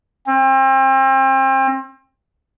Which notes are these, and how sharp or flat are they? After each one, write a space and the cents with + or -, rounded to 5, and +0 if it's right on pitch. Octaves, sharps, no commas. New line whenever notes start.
C4 +35